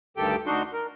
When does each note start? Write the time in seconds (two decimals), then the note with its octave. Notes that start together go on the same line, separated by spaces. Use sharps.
0.17 D2 G2 D#3 G4 A4 G5
0.46 D2 D4 D#4 F#4 C6
0.73 A#4